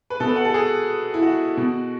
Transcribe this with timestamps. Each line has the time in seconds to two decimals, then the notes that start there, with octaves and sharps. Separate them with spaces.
0.10 B4
0.20 B2 A4
0.29 B4
0.36 F#5
0.45 A4
0.54 G#4
1.14 E4
1.23 F#4
1.57 B2